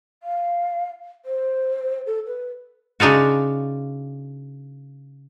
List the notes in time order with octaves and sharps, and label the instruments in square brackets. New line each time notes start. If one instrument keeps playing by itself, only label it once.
[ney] F5
C5
A4
B4
[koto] C#3 D4 D#4 F4 F#4